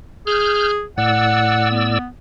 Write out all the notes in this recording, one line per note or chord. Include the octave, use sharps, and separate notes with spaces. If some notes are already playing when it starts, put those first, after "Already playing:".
G#4 F6 G6
A2 D5 F#5 E6
B3